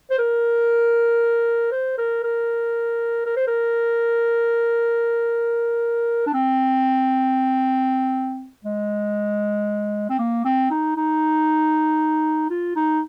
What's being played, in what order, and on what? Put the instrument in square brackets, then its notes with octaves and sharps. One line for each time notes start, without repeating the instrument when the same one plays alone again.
[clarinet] C5
A#4
C5
A#4
A#4
A#4
C5
A#4
D4
C4
G#3
C4
A#3
C4
D#4
D#4
F4
D#4